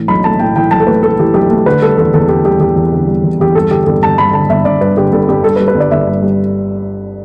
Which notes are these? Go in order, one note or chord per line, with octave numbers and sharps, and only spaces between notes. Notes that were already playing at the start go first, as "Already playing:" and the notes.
Already playing: A2 E3
B1 B5
A3 A5
A2 G5
E3 G5
B1 A5
A4
A3 B4
A2 A4
E3 G4
B1 G4
A3
D3 B4
G3 A4
E2 A4
E2 A4
D3 G4
G3 G4
E2 G4
E2
D3
G3
E2
E2 G4
G2 A4
D3 G4
G1 A4
G1 A5
G2 B5
D3 A5
G1 E5
G1 D5
G2 B4
D3 G4
G1 A4
G1 G4
G2 A4
B4
G3
B4
G1
D5
G1 E5
G2
G3